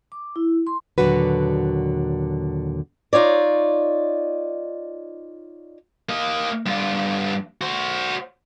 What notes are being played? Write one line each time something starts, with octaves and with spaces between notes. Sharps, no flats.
D6
E4
C6
D#2 A#2 D3 F#3 F#4 B4
D#4 F4 C#5 D5
A#3 D#5
G2 F4
F#4 C5